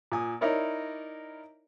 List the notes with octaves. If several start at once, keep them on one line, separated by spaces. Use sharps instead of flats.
A#2 G#5 D#6
D#4 E4 A#4 C#5 D5